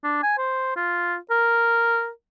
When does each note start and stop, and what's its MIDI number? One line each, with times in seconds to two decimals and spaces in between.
0.04 0.23 62
0.23 0.34 80
0.38 0.74 72
0.76 1.16 65
1.31 2.09 70